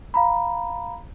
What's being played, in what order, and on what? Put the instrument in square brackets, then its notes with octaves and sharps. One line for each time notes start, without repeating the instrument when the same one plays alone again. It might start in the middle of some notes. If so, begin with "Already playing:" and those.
[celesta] F5 A#5 B5